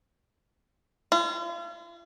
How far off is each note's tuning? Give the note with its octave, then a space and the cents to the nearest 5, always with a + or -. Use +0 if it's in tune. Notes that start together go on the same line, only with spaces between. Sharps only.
F4 -40